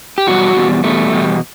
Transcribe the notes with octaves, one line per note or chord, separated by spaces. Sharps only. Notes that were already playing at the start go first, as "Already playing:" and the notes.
G4
E2 B2 G3 F#4
E2 B2 G3
E2 B2 G3 A3
E2 B2 G3